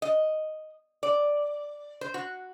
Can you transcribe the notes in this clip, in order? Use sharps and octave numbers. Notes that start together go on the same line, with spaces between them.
D#5
D5
C5
F#4